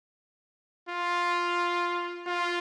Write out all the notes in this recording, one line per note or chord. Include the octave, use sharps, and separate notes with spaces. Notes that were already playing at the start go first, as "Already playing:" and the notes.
F4
F4